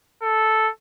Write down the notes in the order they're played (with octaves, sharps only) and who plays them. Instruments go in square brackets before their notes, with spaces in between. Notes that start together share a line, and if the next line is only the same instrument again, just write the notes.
[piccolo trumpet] A4